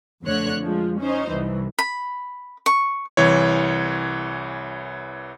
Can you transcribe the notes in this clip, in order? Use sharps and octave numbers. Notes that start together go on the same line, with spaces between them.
F2 D3 A3 C#5 F#6
F3 G#3
C#4 D#4 C5
C2 E3
B5
C#6
C2 E3 C#5